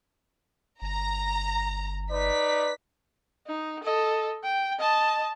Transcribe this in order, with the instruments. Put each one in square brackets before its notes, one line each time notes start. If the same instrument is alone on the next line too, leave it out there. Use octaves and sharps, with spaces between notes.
[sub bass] G1 [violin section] A#5
[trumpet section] D#4 B4 D5 [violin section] B6
[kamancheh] D#4
A4 D#5
G5
D#5 A5